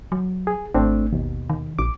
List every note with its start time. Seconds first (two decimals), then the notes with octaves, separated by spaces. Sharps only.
0.12 F#3
0.47 G#4
0.74 G#1 A3 C4 D4
1.12 D#2 B2
1.49 D#3
1.79 A#1 D6